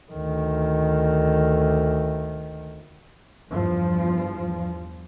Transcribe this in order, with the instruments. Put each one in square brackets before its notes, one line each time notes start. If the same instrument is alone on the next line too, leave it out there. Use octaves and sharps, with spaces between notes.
[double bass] D2 D#3
[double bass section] E2 G2 F3